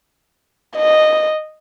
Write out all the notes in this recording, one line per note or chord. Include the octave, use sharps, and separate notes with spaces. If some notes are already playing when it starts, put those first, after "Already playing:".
D#5